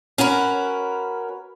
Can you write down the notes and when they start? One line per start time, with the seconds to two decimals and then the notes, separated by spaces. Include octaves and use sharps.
0.18 C#4 F#4 A#4 B4